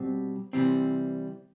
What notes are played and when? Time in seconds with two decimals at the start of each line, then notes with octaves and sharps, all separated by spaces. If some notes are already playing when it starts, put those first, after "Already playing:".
Already playing: B2 G3 C4 F#4
0.53 C3 E3 G3 C4